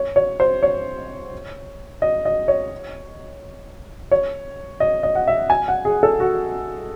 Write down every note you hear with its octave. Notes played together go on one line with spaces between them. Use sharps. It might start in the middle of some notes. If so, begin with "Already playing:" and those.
Already playing: C#5
C#5
C5
C#5
D#5
D#5
C#5
C#5
D#5
D#5
F#5
E5
G#5
F#5
G#4
A4
F#4